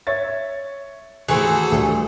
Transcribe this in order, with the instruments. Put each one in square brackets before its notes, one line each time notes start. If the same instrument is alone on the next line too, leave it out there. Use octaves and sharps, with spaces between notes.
[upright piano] C#5 E5 A6
[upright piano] D#2 A2 [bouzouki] E3 F#4 C5 [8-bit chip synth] G#4 A4
[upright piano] D2 G3 [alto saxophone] A3